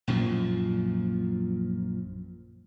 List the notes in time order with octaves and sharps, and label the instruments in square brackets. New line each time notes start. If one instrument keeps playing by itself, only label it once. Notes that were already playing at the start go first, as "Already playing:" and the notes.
[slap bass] A#1 F#2 A#2 F3